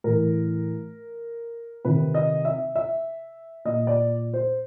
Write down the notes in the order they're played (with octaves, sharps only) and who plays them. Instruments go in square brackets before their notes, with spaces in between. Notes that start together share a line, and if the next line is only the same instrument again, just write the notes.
[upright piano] A2 E3 A#4
C3 D#3 B4
D#5
E5
E5
A#2 D#5
D5
C5